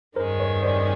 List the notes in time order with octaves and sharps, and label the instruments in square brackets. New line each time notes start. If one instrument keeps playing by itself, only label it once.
[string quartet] G2 D#3 G#3 C#4 [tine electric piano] A#4 C5
[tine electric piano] B4 C#5
C5 D5